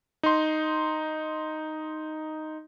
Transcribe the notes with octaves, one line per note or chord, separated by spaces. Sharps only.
D#4 C6